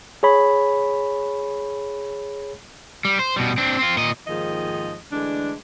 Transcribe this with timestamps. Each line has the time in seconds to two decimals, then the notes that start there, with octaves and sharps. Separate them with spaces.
0.23 G#4 C#5 B5
3.05 G3
3.19 C5
3.36 B2 G3
3.58 C4 D4
3.79 C4 F4
3.97 A#2 D#5
4.27 D#2 G#2 D#3 F3 G#4 D#5
5.11 D3 E3 G#3 A3 D4